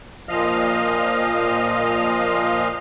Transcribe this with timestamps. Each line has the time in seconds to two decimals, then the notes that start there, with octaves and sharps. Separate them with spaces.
0.29 A#2 F3 D#5 F5 F6